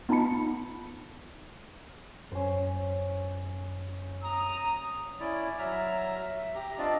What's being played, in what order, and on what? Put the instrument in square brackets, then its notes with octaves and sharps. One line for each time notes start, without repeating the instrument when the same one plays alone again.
[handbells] B3 D#4 F4 A5 B5 C#7
[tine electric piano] F#2 [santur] C#4 C5
[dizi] A#5 [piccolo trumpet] D#6
[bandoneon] C#4 E4 D5
F#3 E5 A#5 F6
E5
G4 A#5
C4 D4 F4 D5 D#5